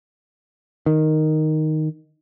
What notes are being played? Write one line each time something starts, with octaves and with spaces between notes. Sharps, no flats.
D#3